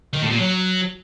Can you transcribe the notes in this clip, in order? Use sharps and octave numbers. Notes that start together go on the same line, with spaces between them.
D#3
A2
A#2
F#3